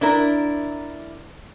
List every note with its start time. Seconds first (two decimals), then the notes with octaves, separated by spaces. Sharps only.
0.01 D4 E4 A#4